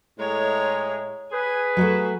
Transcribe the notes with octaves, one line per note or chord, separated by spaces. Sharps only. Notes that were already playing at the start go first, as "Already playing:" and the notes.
A2 G#3 C#5 A#5
G#4 B4 G#5
F#3 G#3 A3 F#4